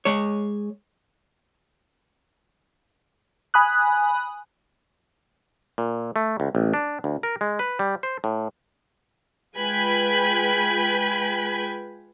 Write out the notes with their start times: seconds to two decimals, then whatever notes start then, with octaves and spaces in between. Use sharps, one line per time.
0.05 G#3 C#5
3.54 G#5 B5 D#6 F#6
5.78 A#2
6.16 A3
6.40 C#2
6.55 A1
6.74 D4
7.04 D2
7.23 A#4
7.41 G#3
7.59 B4
7.79 G3
8.03 C5
8.24 A2
9.57 G#3 F4 B4 G5 G#5 B5